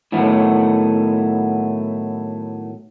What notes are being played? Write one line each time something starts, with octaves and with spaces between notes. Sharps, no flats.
A2 D#3 F#3 A3 B3